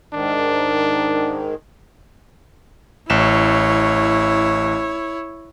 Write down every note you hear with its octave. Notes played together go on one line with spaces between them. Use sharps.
G#2 D#3 D4
A1 E4 C#5 E7